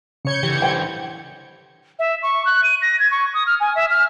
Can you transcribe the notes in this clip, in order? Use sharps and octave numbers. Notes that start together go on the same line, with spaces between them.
C#3 C#5 G6 G#6 C#7
D3 E3 G4
C5 G5
E5
C#6
F#6
D#7
A#6
G#6
C#6
D#6
F6
G#5
E5
F6